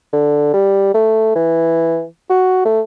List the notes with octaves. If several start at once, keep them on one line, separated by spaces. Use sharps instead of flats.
D3
G3
A3
E3
F#4
A3